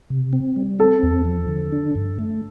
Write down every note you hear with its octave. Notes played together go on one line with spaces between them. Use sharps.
C3
C4
G3
C4 A4
E2
F3
D3
D4
G2
A3